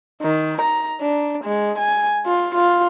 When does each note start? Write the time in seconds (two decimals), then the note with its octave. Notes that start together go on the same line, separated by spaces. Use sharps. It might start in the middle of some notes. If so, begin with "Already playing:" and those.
0.22 D#3
0.61 A#5
1.01 D4
1.44 G#3
1.78 G#5
2.26 F4
2.55 F4